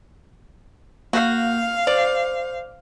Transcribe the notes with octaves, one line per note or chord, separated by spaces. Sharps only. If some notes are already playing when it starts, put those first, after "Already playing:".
A#3 F#4 F5 G6
C5 D5